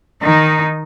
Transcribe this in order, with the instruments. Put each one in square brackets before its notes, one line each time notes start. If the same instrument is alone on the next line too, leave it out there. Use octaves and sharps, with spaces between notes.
[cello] D#3 D#4